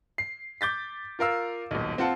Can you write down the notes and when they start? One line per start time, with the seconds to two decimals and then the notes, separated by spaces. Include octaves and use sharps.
0.18 C7
0.61 D6 G6 A6 B6
1.19 F4 A#4 F5 E6
1.71 D#1 B1
1.98 C4 F4 F#5 A5